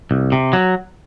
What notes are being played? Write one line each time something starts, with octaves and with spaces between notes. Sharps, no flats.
C2
C3
F#3